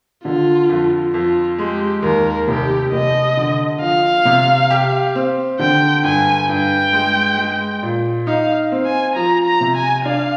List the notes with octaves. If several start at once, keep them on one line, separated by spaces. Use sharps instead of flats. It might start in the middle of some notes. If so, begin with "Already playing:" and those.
D3 F4
F2
F2 F4
G#3 G4
D#2 A#4
F1 G4
F1 D#5
D3
F3 F5
C3
G4
C4
D3 G5
G2 G#5
G2 G5
G#3
G#3
A#2
D#4 F5
C4
G#5
F3 A#5
A#5
C3
G#5
D4 F5